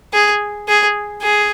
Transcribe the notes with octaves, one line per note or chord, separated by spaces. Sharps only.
G#4
G#4
G#4